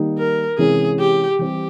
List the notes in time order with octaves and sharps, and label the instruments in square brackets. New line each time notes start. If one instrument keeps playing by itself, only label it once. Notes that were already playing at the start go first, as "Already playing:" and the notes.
Already playing: [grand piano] D#3 G3 A#3 D#4
[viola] A#4
[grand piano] C3 E3 G#3 C#4 E4 [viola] G#4
[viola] G4
[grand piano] E3 G3 C4 [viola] G4